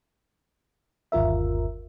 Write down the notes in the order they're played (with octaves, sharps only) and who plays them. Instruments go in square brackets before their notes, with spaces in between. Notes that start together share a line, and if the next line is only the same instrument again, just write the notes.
[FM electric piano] G1 D#2 F4 A#4 E5